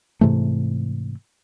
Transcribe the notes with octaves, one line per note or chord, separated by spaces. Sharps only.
G#2 C3 E3 A3